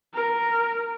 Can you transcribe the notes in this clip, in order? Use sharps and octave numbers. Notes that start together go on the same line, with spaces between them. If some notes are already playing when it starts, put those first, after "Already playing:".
A#4